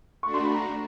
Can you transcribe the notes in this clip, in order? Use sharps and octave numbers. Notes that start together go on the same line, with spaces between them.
A3 D4 F#4 C#6
C6
B5
A#5